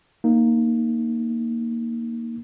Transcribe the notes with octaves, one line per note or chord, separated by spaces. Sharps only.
A#3 D#4